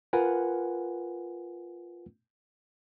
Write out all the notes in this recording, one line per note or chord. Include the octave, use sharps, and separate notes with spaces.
F4 A#4 B4 F#5 G#5